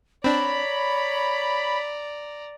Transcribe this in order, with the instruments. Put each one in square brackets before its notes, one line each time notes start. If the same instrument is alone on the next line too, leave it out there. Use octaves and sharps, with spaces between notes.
[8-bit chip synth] C4 D4 [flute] C#5 [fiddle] D5 A#5 [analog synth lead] B5